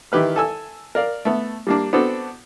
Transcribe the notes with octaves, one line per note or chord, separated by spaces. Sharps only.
D#3 E3 G4 B4 F6
A4 G#5 E6
A#4 D5 F5
A3 B3
G3 A#3 D4
B3 C4 D4 F#4 A4